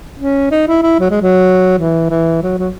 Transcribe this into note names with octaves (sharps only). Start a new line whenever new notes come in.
C#4
D#4
E4
E4
F#3
G#3
F#3
E3
E3
F#3
F#3